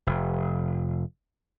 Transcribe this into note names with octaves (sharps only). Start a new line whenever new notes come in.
F1